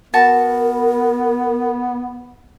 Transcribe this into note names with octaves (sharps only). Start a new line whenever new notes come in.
B3 F#4 A#4 A5